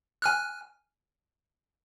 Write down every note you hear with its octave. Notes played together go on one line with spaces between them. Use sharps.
G#5 F6 F#6